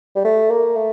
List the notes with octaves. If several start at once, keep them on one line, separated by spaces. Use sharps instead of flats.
G3
A3
A#3
A3